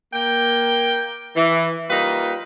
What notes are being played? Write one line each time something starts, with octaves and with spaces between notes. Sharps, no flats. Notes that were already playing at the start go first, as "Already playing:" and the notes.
A#3 G5
E3
G3 A#3 D#4 F4 B4